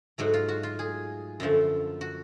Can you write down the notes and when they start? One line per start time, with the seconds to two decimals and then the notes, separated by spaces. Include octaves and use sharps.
0.18 G#2 F#3 A3 F#4
0.34 F4
0.48 F#4
0.63 F4
0.79 G#4
1.40 F#2 D3 F3 A3
2.01 F#4